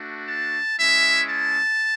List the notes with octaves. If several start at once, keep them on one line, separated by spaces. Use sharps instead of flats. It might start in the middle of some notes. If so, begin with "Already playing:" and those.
Already playing: A3 D4 F#4
A5
G#3 C#4 E4 E5
A5